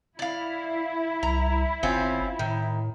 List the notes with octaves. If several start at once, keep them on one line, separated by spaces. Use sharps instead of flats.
E4 D5 F5
C2 A#5
G1 C4 C#4 F4
A2 D#3